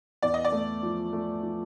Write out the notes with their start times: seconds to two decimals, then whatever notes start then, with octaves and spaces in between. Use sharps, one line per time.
0.22 E2 D5
0.34 D#5
0.45 D5
0.52 A3
0.83 F3
1.13 A3
1.43 F3